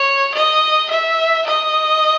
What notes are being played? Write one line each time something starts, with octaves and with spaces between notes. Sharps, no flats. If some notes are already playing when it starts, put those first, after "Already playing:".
Already playing: C#5
D#5
E5
D#5